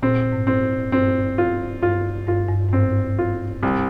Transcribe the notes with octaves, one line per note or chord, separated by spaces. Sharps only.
A#2 C4
A#2
G#2
C4
G2 C4
F4
G2 F4
G2 F4
G2
G2
G#2 C4
F4
C2